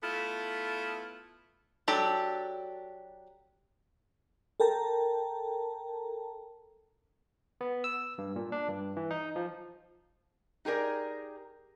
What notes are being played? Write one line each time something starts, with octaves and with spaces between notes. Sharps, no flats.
A3 B3 E4 F4 A4
F#3 D4 G4 A4
A4 A#4 G5 A5 A#5
B3
E6
G2
A#2
D4
G2
E3
D#4
F3
D#4 G4 G#4 A#4 D5